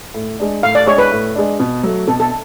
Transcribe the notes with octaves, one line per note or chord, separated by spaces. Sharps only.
A2
G#3 D4
A2 F5
D5
G#3 D4 C#5
B4
A2
G#3 D4
B2
F#3 A3
B2 A4
A4